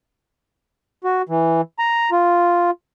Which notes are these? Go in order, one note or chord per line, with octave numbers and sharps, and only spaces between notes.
F#4
E3
A#5
F4